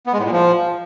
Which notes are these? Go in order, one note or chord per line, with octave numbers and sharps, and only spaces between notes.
B3
G#3
A2
A#2
F3